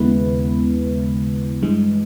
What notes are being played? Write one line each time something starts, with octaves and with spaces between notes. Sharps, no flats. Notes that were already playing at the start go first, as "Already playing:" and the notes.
Already playing: D#2 C#3 G#3 B3 E4 B4
G2 E3 G#3